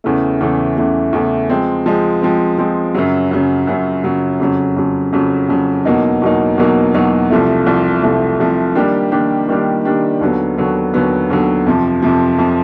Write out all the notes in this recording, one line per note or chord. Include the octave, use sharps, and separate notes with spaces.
E2 C#3 E3 A3
E2 C#3 E3 A3
E2 C#3 E3 A3
E2 C#3 E3 A3
F3 G#3 C4
F3 G#3 C4
F3 G#3 C4
F3 G#3 C4
F#2 C#3 F#3
F#2 C#3 F#3
F#2 C#3 F#3
F#2 C#3 F#3
F2 C#3 F#3
F2 C#3 F#3
F2 C#3 F#3
F2 C#3 F#3
E2 B2 F#3 A#3 D#4
E2 B2 F#3 A#3 D#4
E2 B2 F#3 A#3 D#4
E2 B2 F#3 A#3 D#4
C2 C3 F3 A3
C2 C3 F3 A3
C2 C3 F3 A3
C2 C3 F3 A3
D#3 G3 A#3 D4 G4
D#3 G3 A#3 D4 G4
D#3 G3 A#3 D4 G4
D#3 G3 A#3 D4 G4
D#2 D3 F#3 B3
D#2 D3 F#3 B3
D#2 D3 F#3 B3
D#2 D3 F#3 B3
F2 C3 F3
F2 C3 F3
F2 C3 F3